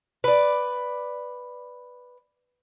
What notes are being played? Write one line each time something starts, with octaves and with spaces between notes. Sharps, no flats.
B4 D5